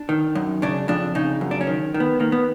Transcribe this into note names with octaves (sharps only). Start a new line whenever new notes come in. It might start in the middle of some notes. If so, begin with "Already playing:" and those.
Already playing: D4
D#3
F#2
C#3 D4
F2 D4
C#3 D#4
F#2
D4
C#4
D#3
D#3
B3
D#3 A#3
B3